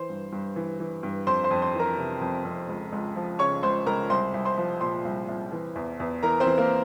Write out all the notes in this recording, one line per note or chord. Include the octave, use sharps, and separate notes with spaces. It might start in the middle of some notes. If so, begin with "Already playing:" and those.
Already playing: E3 C5 C6
G2
G2
E3
E3
G2
F2 C5 C6
C5 C6
F2
C5 C6
E3
A#4 A#5
C3
F2
F2
C#2
C#2
F3
C#3 C#5 C#6
C#2 C5 C6
C#2 A#4 A#5
C2 C5 C6
C2
C5 C6
F3
A#2 C5 C6
C2
C2
E3
E2
E2
E3 A#4 A#5
C4 C5
E3
A#3 A#4